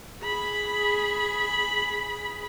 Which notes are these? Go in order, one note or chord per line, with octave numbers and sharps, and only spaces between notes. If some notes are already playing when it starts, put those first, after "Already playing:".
G#4 B5